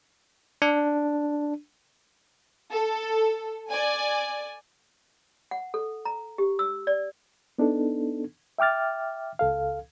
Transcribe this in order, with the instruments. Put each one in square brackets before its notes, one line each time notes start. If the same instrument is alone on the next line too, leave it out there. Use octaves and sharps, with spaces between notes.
[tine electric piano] D4
[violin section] A4
D5 G#5
[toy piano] F#5
A4
A#5
G4
E6
D5
[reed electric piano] B3 D4 D#4 A4
E5 G5 D6 F6 A6
C#2 A4 F5